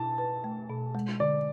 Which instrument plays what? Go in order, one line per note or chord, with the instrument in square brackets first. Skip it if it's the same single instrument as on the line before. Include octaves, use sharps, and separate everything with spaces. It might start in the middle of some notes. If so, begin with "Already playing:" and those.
Already playing: [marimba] B2 E4 [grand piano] A5
[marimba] B4
A3
B2
G#3
[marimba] D3 [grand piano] D5